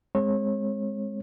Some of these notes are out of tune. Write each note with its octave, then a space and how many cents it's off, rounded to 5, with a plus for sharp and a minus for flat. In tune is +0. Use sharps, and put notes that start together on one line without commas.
G#3 +0 C4 +15 C#5 -30